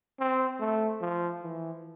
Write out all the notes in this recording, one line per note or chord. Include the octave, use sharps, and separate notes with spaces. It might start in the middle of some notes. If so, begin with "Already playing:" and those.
C4
A3
F3
E3